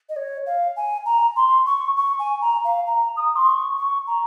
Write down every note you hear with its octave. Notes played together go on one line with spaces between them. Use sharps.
D#5
C#5
F5
G#5
A#5
C6
C#6
C#6
G#5
A#5
F5
A#5
D#6
C6
C#6
C#6
A#5